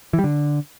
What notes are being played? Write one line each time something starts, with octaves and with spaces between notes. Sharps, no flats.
E3
G3
D3